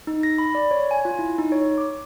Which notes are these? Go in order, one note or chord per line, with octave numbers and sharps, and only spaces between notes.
D#4
A#6
B5
D5
C#5
G#5
F4
E4
D#4
C#5
D6